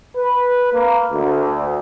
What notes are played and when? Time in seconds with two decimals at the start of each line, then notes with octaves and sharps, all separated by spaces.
0.17 B4
0.73 A#3
1.12 D2